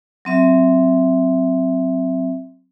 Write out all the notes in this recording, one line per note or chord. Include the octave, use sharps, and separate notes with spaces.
F#3 C4 E5